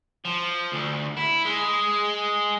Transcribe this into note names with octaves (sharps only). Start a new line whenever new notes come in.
F3
D2
E4
G#3